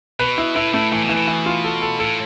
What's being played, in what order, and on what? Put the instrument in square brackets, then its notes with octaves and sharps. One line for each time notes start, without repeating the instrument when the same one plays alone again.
[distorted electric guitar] B2 [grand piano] B4
[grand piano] E4
[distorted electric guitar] A2 [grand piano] E4
[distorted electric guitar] A2 [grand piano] A3
[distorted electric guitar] A2 [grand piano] E3
[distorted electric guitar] B2
[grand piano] E3
[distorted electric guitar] B2
[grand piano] E3
F4
A4
A4
[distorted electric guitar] A2 [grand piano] A4